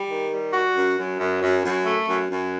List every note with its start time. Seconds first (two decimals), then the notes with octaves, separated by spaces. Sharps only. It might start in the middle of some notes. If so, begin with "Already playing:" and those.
Already playing: G3
0.09 D#3
0.31 G3
0.54 F#4
0.75 F#2
0.97 F#2
1.19 F#2
1.42 F#2
1.64 F#2
1.86 A3
2.08 F#2
2.30 F#2